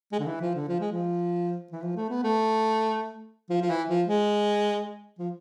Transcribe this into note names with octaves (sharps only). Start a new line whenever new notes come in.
G#3
D3
E3
F3
D3
F3
G#3
F3
E3
F3
A3
B3
A3
F3
F3
E3
F3
G#3
F3